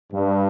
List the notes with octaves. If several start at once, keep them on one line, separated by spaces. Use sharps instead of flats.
G2